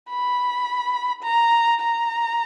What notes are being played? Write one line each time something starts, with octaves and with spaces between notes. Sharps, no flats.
B5
A#5
A#5